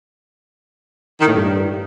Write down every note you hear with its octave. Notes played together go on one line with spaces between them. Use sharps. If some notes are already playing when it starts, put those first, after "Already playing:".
D#3
A2
G2